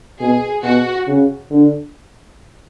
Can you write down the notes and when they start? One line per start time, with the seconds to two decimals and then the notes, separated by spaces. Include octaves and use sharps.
0.20 B2 G#4
0.64 B2 F#4
1.08 C#3
1.51 D3